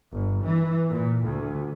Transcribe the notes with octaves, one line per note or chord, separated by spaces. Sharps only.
G1
E3
A#2
D2